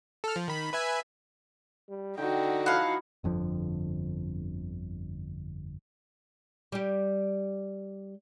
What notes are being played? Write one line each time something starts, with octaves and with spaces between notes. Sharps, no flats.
A4 F6
F3
D#3 B5
B4 E5 G#5
G3
D3 D#4 F#4 G5
F3 E4 F5 F#5
G1 F2 D3 F3
G3 G4